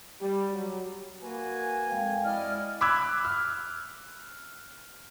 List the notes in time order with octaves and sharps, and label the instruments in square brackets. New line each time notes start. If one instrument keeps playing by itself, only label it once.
[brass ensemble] G3
F#3
[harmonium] A#3 F#4 B4 [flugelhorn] G#5
[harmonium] F2 [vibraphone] G#3 F5 G5
[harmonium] E4 D5 D#5 [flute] F6
[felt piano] B5 D6 E6 F#6 G#6
F6